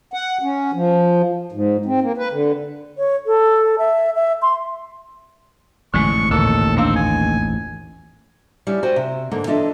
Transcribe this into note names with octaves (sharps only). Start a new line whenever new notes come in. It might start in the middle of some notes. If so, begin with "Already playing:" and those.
F#5
C#4
F3
G#2
C4
A#3
B4
D3
C#5
A4
E5
E5
C6
A1 F2 G#2 D3 G#3 C#6
D#2 A#2 D3 A4
A#3 C4 D4 F5
G#5
G3 C#4 E4
F#4 C5 D5 G5 G#5
C3
G#2 D3 A#3
E3 D4 F4 A4 D#5 E5